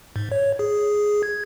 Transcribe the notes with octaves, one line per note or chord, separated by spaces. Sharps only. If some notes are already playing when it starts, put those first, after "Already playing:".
G#2
C#5
G#4
G#6